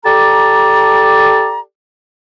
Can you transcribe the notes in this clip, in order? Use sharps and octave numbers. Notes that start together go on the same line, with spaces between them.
G4 A4 D5 A5 A#5